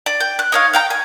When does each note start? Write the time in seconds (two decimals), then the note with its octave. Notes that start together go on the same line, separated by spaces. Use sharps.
0.06 D5
0.20 G5
0.39 F#6
0.52 D#4 C#5 F5
0.73 F5 G5 A#5
0.90 G#5